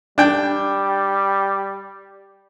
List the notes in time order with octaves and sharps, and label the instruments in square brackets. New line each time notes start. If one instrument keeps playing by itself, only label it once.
[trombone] G3 [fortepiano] D4 G5